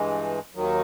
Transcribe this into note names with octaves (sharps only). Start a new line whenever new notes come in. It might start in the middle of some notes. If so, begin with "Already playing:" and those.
Already playing: G2 E3 G#3
D#2 D#3 F#3